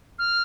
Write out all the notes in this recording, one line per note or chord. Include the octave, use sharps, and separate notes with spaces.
F6